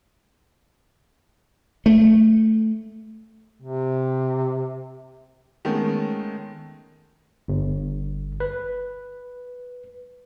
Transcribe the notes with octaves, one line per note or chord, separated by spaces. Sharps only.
A3
C3
D#3 G#3 A3 B3 C#4
G1
B4